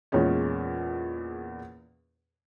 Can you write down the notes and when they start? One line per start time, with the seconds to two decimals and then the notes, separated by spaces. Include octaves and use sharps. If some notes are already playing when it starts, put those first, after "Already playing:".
0.12 E2 A#2 G#3 C#4